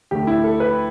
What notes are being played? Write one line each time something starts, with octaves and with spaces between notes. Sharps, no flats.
D2 D3 A3 G4
E4
A4
B4